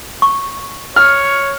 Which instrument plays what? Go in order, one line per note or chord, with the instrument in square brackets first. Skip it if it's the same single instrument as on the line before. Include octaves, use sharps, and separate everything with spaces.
[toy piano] C#6
[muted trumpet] C#5 [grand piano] F6